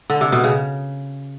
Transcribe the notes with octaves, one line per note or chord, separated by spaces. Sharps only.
D3
C3
B2
C#3